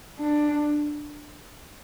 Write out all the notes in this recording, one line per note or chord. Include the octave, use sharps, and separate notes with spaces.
D4